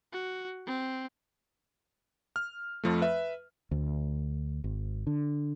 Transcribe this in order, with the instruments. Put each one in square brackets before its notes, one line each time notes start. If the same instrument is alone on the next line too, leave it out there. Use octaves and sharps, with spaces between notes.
[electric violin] F#4
C4
[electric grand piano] F6
F2 F3 A3
B4 E5
[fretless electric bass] D2
G#1
D3